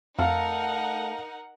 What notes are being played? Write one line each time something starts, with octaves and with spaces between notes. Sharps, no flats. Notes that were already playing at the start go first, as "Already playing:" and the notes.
F2 A3 D#4 A4 A#4 F5 F#5